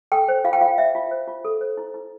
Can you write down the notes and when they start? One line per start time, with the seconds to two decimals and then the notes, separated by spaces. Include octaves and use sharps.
0.12 A4 G5
0.28 C5
0.44 F4 F5
0.53 G5
0.61 F4 F5
0.78 C5 E5
0.95 F4
1.11 C5
1.27 F4
1.45 A4
1.61 C5
1.77 E4
1.94 E4